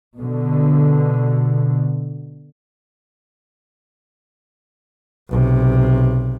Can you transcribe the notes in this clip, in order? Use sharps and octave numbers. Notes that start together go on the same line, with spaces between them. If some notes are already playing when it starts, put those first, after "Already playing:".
B2 D3
B1 C3